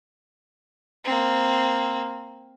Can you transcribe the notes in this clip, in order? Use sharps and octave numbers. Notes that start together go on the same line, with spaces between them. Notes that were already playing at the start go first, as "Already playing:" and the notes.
A#3 C4